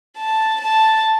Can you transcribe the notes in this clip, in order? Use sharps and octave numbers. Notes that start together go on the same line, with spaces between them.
A5
A5